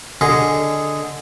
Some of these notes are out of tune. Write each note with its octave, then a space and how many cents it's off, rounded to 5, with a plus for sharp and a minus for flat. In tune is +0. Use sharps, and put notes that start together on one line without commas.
D3 +0 G#4 +0 D#5 +0